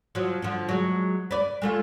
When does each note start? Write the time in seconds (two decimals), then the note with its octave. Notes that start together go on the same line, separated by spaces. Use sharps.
0.15 F3 F#3
0.42 D3 F3
0.69 F#3 G#3
1.31 B4 D5
1.62 G#3 A3 F4